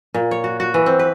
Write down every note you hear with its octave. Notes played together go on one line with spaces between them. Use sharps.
A#2
C#5
F#4
F#4
E3
C4
B4